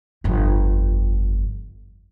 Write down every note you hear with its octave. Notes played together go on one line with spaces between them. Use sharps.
G1 F2